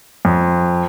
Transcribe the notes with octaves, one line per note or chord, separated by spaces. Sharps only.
F2